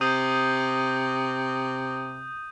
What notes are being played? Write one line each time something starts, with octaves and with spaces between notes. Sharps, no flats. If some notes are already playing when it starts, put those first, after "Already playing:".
C3 D#6 G6 D#7